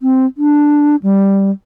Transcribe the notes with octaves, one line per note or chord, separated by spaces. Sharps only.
C4
D4
G3